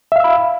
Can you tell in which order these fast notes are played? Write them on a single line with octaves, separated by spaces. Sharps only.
E5 F5 E6 B5